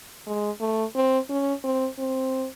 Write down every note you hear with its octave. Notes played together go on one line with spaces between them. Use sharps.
G#3
A3
C4
C#4
C4
C4